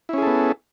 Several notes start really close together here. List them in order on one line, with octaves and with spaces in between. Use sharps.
E4 C#4 G#4 A4 B3